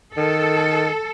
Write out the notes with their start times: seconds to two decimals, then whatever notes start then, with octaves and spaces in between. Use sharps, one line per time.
0.17 D#3 A4